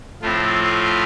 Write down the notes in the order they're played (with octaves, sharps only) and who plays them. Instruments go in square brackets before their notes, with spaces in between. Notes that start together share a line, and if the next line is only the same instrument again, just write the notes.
[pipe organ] A2 F3 A3 C4 F4